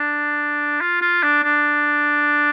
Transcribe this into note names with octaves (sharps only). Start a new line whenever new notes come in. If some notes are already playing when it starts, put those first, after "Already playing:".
Already playing: D4
F4
F4
D4
D4